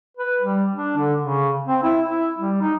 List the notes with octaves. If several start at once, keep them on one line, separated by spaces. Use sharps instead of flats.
B4
G3
D4
D3
C#3
C4
E4
E4
G3
D#4